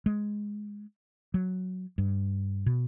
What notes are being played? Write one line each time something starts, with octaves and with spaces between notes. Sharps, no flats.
G#3
F#3
G2
B2